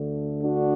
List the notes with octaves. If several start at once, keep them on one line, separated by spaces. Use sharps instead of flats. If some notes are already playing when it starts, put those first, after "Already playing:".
Already playing: D2 D3 A3
D4 F#4